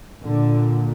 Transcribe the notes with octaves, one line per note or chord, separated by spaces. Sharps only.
A#2 D3